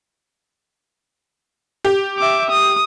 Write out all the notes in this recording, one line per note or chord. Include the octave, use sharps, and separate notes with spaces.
G4
E5 D6
D#6